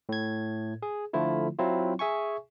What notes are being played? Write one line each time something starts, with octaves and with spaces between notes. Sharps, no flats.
A2 G#6
G#4
D3 F3 A3 E4 F4
F#3 C4 E4 F4
G#4 E5 G#5 C#6